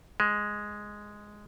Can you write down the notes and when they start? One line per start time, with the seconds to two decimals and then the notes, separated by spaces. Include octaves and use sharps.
0.20 G#3